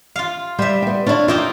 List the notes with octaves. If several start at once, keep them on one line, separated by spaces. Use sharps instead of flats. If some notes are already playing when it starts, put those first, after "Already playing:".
F4 F5
G3 C5 E5
G3 B3
D4 E4 F4 C#5
A#3 D#4 F4 G4 E5